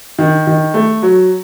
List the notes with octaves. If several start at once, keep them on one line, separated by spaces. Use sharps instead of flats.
D#3
D#3
A3
F#3